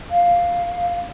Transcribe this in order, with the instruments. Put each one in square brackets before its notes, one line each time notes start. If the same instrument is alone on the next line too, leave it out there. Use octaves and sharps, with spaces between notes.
[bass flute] F5